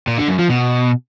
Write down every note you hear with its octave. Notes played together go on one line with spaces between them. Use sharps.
A#2
D3
F#2
F3
B2